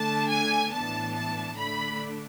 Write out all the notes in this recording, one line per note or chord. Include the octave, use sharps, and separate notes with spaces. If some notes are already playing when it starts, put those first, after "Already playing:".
Already playing: D3 A3 D4 A5
G#5
A2 E3 B3 D4 A5
A5
D3 A3 D4 B5